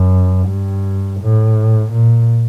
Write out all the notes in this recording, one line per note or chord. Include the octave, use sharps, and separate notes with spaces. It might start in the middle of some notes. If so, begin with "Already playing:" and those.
Already playing: F#2
G2
A2
A#2